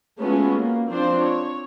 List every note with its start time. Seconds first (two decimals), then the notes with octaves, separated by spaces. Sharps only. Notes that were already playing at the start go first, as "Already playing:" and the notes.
0.19 G#3 A3 B3 C#4 F4 F#4
0.58 A#3
0.89 F3 C4 D4 C5
1.20 C#5